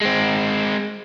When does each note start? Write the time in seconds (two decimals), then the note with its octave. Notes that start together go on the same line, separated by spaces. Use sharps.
0.01 G#3 C4